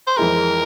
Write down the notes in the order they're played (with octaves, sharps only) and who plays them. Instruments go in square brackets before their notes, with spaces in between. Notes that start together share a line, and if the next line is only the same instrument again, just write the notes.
[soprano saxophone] C5
[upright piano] F2 E3 G#3 E4 G#4 [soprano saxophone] A#4